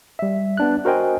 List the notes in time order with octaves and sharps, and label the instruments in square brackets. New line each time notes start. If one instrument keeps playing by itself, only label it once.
[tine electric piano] G3 E5
B3 D4 F#6
F#4 A#4 C5 D#5 G5 G#5